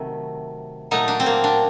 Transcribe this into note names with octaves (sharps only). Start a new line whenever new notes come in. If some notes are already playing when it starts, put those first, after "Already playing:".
Already playing: C3 D#3 F#3 A3
A#2 F#3 A3 D#4
D4
C4
A#3
D4